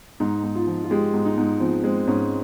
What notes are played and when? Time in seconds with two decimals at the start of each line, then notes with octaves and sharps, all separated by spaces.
0.20 G#2 D#4
0.43 G#2
0.55 F4
0.67 F3
0.84 F4
0.90 G#3 G4
1.13 G#2
1.26 D#4
1.37 G#2
1.60 F3 C4
1.84 G#3 C4
2.07 G#2 C#4